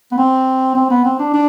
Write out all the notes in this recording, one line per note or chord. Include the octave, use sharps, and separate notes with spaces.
B3
C4
C4
B3
C4
D4
D4